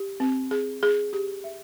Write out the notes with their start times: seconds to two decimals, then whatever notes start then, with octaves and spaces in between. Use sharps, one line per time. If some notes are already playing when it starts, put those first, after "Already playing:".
Already playing: G4
0.20 C4
0.51 G#4
0.83 G#4
1.13 G4
1.44 E5